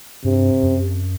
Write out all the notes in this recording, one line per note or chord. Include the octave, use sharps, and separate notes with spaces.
G2 C3
F#2